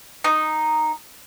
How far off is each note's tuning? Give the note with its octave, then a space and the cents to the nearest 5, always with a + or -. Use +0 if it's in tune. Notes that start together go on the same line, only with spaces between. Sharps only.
D#4 -5